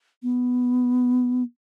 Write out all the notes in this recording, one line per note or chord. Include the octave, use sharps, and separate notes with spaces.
B3